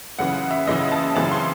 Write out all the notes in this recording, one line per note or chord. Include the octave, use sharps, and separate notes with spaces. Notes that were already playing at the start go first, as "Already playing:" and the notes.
F#2 C#3 E3 F#5
E5
F#2 C#3 E3 D#5
A5
F#2 C#3 E3 C4 A5
C6